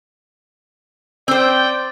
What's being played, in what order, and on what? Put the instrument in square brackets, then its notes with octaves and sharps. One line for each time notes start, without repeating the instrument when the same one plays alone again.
[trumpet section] G3 G5 [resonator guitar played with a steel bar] C4 C5 [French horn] D5